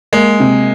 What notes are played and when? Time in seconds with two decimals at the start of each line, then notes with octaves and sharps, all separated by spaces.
0.13 G#3 A#3
0.40 C3